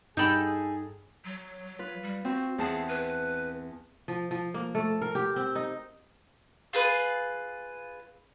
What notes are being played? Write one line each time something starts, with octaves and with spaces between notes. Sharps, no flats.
G2 D#4 G#4 A4 G5 B5 G6
F#3
F4 B4
G3
C4 F#4
E2 G#4 A5
B4
F3
F3
A#3
A3
A#4
G4
C4
D#4
F4 G#4 B4